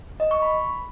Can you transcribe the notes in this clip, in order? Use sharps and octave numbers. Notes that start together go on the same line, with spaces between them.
D#5
C#6
B5